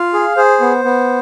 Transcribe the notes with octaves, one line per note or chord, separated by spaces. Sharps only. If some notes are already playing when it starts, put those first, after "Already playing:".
Already playing: F4 F5
G#4
G#4 C5
B3
B3